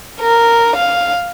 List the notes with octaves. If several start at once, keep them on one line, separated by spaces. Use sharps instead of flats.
A#4
F5